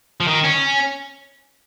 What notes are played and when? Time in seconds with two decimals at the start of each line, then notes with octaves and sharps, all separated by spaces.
0.20 F3
0.28 D#3
0.44 C#4